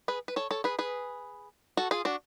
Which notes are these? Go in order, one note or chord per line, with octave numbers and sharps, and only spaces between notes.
G#4 B4
B4
A4 C#5
A4 C#5
G#4 B4
G#4 B4
F#4 A4
F4 G#4
D4 F#4